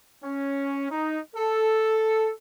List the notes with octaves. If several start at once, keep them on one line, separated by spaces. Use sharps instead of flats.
C#4
D#4
A4